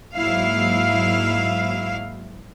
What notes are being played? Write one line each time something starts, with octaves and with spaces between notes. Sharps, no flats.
G#2 F#3 A#3 E4 F5